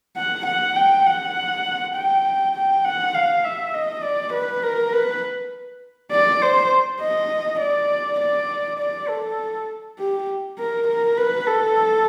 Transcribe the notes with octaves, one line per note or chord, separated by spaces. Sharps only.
F#5
F#5
G5
F#5
G5
G5
F#5
F5
E5
D#5
D5
B4
A#4
B4
D5
C5
D#5
D5
D5
D5
A4
G4
A#4
A#4
B4
A4